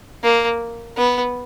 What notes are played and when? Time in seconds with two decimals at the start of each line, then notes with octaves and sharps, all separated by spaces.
0.24 A#3
0.97 B3